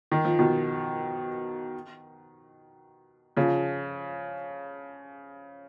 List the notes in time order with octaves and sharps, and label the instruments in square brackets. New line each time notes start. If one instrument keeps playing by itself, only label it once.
[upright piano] D#3
F3
B2 D#3
C#3 F3